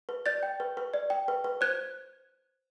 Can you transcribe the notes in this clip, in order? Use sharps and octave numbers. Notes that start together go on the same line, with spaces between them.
B4
D5 G6 A6
G5
B4
B4
D5
G5
B4
B4
C5 F#6 G#6